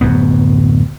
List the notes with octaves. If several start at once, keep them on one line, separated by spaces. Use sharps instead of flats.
D1 F#2 B3